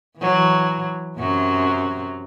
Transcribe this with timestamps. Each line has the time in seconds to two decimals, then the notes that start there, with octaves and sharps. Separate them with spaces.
0.18 E3 F#3
1.19 F#2 C3 F#3